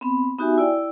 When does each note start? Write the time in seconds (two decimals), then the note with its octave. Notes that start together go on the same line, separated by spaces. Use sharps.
0.01 B3 C4 B5
0.38 B3 D#4 F#4 G4 E5 G#5
0.58 E4 D5 G5